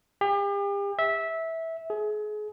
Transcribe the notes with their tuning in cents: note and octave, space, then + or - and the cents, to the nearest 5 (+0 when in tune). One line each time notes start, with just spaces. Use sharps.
G4 +40
E5 -15
G#4 +30